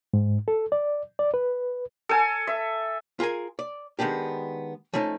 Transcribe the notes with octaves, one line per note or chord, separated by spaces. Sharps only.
G#2
A4
D5
D5
B4
A4 G#5
E5
F4 G#4 A#4 G#5
D5
D#3 G#3 B3 D4 G4
F3 A3 C#4 D#4